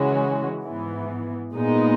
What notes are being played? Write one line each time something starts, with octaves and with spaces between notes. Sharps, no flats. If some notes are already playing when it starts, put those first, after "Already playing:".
Already playing: C#3 E3 G#3 C#4 F#4
G#2 E3 B3
A#2 G#3 B3 D#4